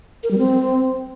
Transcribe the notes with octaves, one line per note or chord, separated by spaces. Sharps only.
A#4
G3
C4